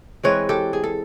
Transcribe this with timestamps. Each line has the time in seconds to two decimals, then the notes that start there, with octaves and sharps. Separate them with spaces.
0.23 E3 G#3 C4 B4 C#5
0.49 G4 A4
0.73 G#4
0.83 A4